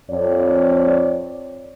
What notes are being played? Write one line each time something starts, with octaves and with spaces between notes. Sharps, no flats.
F2 C#5 D5